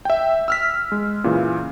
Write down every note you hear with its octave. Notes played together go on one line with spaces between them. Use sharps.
E5 G5
E6 F6 B6
G#3
A#2 C#3 E3